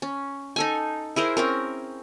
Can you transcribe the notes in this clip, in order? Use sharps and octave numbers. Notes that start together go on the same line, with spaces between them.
C#4
D#4 A4 G#5
E4 G#4 A#4 C5
C4 C#4 A#4